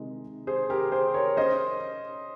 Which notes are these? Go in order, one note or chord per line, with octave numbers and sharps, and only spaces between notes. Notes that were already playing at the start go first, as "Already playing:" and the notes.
Already playing: C3 D#3 G#3 D#4
G#4 C5
G4 A#4
G#4 C5
A#4 C#5
C#4 C5 D#5